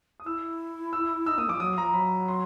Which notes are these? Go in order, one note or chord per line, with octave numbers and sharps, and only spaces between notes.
D#6
E4 E6
E6
D#4 E6
A#3 D#6
F3 D6
F#3 D#6
F3 A#5
F#3 B5
C6